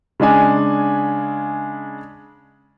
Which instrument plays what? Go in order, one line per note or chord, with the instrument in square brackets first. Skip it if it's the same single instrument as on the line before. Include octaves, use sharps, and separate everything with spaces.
[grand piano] C#3 G#3 D4 G#5